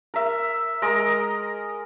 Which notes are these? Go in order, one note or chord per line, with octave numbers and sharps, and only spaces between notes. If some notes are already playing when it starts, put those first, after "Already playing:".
A#4 E5
G#3 A#4 D#5